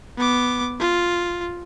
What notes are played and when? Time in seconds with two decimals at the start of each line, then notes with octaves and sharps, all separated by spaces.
0.18 B3 D6
0.80 F4